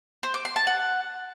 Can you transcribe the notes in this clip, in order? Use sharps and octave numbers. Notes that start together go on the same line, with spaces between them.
C5
D6
C6
A5
F#5